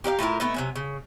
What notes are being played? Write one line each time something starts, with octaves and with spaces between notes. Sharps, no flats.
G4 A#4 D5 F5
A2 E4 F4 A#4
A3 B3 D#4
C3 F#3 G#5
C#3